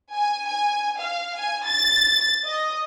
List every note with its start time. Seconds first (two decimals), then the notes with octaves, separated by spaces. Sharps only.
0.13 G#5
0.48 G#5
1.00 F5
1.37 G#5
1.67 A6
2.46 D#5